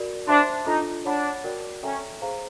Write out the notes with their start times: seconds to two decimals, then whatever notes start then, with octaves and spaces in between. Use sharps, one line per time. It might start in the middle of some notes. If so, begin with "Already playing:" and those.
Already playing: F#4 A#4 D5
0.27 D4 C5 E5 A5 C6
0.66 D4 D#4 F4 A4
1.05 D4 C#5 F#5 B5
1.44 F#4 A#4 D5 G5
1.83 C#4 A4 C#5 E5 G5 A#5
2.22 G#4 C5 F5 A#5